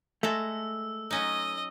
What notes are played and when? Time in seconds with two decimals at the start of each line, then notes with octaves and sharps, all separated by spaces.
0.23 G#3 A3 A4 A#5 E6
1.11 F#3 C#4 D#4 D#5